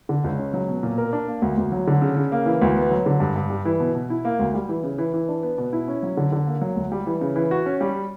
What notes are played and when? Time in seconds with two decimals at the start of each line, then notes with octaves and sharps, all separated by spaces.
0.09 D3
0.24 C#2
0.39 C#4
0.54 F#3
0.68 B2
0.83 A#2
0.98 A#4
1.13 D4
1.28 A#3
1.42 D2
1.58 D2
1.72 F#3
1.87 D3
2.02 C#3
2.17 C#3
2.32 A#3
2.46 E3
2.62 D2
2.76 B3
2.91 F#3
3.06 D3
3.20 G2
3.36 G2
3.50 G3
3.65 E3
3.80 B2
3.95 B2
4.10 E4
4.25 A#3
4.39 D2
4.54 G3
4.69 E3
4.84 C#3
4.98 E3
5.14 E3
5.29 D4
5.43 B3
5.58 B2
5.73 E4
5.88 C#4
6.03 F#3
6.17 D3
6.32 D3
6.47 A#3
6.61 F#3
6.76 D2
6.92 G3
7.06 E3
7.21 C#3
7.36 E3
7.51 F#4
7.66 C#4
7.81 G3